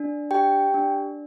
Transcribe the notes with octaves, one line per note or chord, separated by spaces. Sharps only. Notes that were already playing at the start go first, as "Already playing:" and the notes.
Already playing: D4
G4 G5
D4